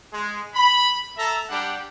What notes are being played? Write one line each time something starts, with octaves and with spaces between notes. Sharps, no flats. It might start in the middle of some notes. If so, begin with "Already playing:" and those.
G#3
B5
A4 E5 A5 A#5
G3 D4 G4 F#5